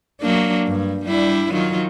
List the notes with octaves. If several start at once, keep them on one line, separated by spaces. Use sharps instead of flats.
F#3 A#3 D4
G2
G3 D4 E4
D#3 F#3 F4